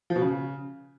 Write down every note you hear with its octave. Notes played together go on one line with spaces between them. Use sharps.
F3
B2
C#3